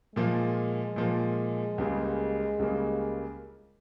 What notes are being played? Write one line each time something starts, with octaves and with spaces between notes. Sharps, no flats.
A#2 F3 G#3 A#3
A#2 F3 A#3
C#2 C#3 G3 A#3
C#2 C#3 G3 A#3